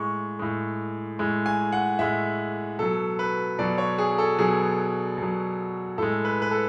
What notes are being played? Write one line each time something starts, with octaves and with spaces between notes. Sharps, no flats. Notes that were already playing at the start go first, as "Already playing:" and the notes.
Already playing: A2 G#3 C#6
A2 G#3
A2 G#3
G#5
F#5
A2 G#3 E5
B2 F#3 A4
B4
B2 F#3 D5
C#5
G#4
A4
B2 F#3 G#4
B2 F#3
A2 G#3 A4
B4
B4
A4